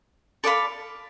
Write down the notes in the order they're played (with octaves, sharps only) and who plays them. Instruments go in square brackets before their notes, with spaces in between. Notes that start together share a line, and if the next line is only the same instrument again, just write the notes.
[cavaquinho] A4 D5 F5 B5